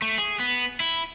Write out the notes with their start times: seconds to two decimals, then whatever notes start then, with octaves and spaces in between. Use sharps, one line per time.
0.02 A3
0.18 G#4
0.40 B3
0.80 E4